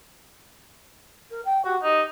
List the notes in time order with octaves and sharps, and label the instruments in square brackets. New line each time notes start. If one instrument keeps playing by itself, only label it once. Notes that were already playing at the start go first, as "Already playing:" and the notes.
[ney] A#4
G5
[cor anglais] F#4 [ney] G4
[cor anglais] D#4 [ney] G4